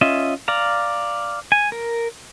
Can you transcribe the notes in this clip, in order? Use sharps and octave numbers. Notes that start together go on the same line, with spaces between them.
C#4 F4 D#5 E5
D5 F5 A#5
G#5
A#4